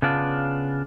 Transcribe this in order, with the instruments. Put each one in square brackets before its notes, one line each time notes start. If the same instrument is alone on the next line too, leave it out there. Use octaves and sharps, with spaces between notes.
[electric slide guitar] C#3 B3 D4 F4